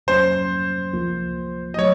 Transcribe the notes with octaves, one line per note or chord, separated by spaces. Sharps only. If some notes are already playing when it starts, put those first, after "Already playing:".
F2 C3 F#3 A#3 C#4 C5
C#2 C3 F3 A#3 F4
D#5
F#3 A3 C#5